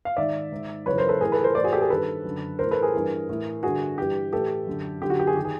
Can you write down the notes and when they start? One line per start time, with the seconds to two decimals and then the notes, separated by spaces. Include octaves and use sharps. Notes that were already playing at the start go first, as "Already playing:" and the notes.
0.05 F5
0.17 G#2 D#3 D5 E5
0.52 G#2 D#3
0.86 F#2 C#3 E3 B4 C#5
0.98 A#4 C5
1.09 A4 B4
1.21 A2 E3 G#4 A#4
1.32 A4 B4
1.43 A#4 C5
1.55 A2 E3 C5 D5
1.64 F#4 G#4
1.72 G4 A4
1.81 G#4 A#4
1.90 G2 D#3 A4 B4
2.25 F#2 D3
2.59 A2 E3 A#4 C5
2.71 A4 B4
2.82 G#4 A#4
2.93 G2 E3
3.29 A2 E3
3.63 G2 D3 F#4 G#4
3.98 G2 E3 G4
4.33 A2 E3 G4 A4
4.67 F#2 D3
5.02 F#2 D3 G4
5.10 F#4
5.20 G4
5.27 F#4 G#4
5.36 D#3 G4
5.45 G#4